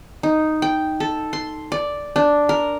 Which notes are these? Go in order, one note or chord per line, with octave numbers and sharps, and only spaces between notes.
D#4
G5
A4
C6
D5
D4
A#4